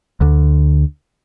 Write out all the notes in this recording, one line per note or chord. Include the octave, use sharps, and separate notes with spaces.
D2 D3